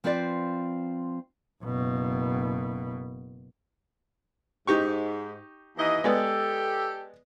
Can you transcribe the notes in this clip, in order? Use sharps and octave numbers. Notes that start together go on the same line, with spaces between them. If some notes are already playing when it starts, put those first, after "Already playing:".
F3 C4 F4 B4 D5
F#1 B2
G#2 D#4 G4 C#6
D#2 E3 D#5
G#3 B3 G4 A4 D5